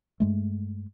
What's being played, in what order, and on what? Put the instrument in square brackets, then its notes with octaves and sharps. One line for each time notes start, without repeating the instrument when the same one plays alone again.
[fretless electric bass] G2 G#3 A3